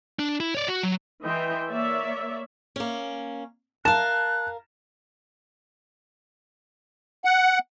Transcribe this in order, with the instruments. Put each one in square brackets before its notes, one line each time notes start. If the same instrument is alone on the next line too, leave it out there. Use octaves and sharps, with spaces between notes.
[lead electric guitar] D4
E4
C#5 D5
F#4
F#3
[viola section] E3 D#5 E5 G5 C6
A#3 C#5 D5 E5
[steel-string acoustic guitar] A#3 C#4
[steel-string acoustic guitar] A#4 F5 [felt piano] A5 E7 [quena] F#6
[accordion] F#5